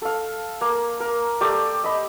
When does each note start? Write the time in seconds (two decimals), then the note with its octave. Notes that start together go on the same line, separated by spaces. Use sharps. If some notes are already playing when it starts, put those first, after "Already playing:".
0.02 A4 F5
0.61 A#3
1.00 A#4
1.41 A3 G4 D5
1.84 D#5 B5